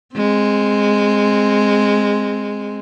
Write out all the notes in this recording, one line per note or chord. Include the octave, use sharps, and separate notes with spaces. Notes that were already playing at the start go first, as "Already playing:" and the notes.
G#3 C4